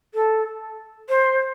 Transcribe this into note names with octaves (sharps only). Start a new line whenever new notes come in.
A4
C5